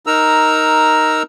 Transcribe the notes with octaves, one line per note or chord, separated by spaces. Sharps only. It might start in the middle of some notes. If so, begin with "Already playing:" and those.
D#4 A#4 A#5 E6